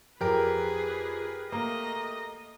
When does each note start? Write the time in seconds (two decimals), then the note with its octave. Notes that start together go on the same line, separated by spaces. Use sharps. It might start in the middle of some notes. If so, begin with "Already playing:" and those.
0.21 F2 G4 G#4 A#4 B4
1.52 A3 A#3 D#5